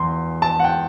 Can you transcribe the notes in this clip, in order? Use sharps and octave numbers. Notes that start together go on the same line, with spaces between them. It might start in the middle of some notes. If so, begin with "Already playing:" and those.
Already playing: E2 C6
A5
F#5
G5